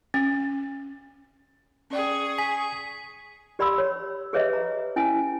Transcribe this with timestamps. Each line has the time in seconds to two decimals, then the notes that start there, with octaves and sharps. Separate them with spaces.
0.14 C#4
1.90 C#4 G#4 D5 G5 C#6
2.38 G#5 B6
3.59 G4 D5 B5 C6 E6
3.78 C#5
4.33 G4 G#4 B4 C#5 D#5 E5
4.53 A#5
4.96 C#4 E4 G#5